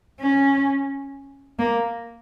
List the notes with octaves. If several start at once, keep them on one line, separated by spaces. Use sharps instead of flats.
C#4
A#3